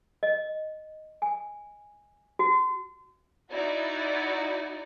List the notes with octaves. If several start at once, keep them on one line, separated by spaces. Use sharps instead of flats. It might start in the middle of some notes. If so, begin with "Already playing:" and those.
D#5
G#5
F#4
D#4 E4 F#4 D5